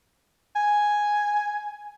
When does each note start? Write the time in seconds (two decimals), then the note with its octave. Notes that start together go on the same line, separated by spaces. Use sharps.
0.56 G#5